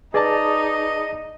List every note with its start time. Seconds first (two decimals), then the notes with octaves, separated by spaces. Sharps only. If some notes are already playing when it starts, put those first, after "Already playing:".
0.14 D#4 G#4 B4 D5 D#5 A5 D6 A6